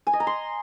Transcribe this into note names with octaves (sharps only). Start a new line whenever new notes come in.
G#5
D#5
A#5
C6